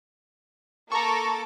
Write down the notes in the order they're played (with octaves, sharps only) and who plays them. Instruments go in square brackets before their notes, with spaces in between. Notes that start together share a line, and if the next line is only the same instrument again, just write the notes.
[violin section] A#3 A4 D6 [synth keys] A#5 C#6